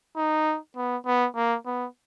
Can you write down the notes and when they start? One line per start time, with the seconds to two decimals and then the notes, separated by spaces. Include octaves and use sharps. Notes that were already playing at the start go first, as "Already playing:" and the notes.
0.17 D#4
0.76 B3
1.06 B3
1.36 A#3
1.66 B3